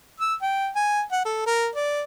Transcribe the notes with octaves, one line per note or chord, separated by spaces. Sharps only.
E6
G5
G#5
F#5
A4
A#4
D5